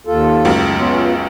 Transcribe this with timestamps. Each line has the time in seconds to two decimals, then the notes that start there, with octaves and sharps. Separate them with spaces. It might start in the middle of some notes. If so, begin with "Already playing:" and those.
0.07 D#2 F4 A4
0.45 C#2 F#2
0.78 B3 C#4 F4